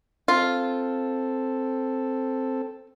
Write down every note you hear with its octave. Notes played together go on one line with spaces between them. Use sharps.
C4 F4 A4